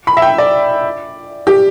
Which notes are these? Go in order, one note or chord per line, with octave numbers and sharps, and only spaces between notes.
B5
E5
G5
D5
G4